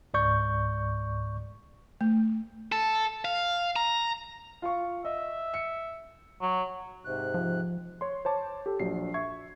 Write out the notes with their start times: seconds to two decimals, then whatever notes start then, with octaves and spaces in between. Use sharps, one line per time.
0.14 C#2 G#2 D5 C#6 G6
2.01 A3
2.72 A4
3.25 F5
3.76 A#5
4.62 F4 F5 C#6
5.05 D#5 E5
5.54 C#7
6.41 F#3
7.05 G#2 C3 F#6
7.34 F3
8.01 C#5 C6
8.25 C5 C#5 A5 D6
8.66 G4 A4
8.80 A#1 F#3 C7
9.14 E5 C#6 G#6